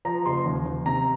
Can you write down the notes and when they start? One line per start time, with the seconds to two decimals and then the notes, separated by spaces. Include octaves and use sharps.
0.05 F3 A#5
0.26 F#1 C6
0.46 D#2
0.66 D#2
0.86 C3 A#5